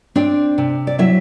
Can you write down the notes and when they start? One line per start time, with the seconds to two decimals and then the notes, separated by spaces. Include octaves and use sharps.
0.15 C4 D4 D5
0.58 C3
0.87 D5
0.99 F#3 E4 E5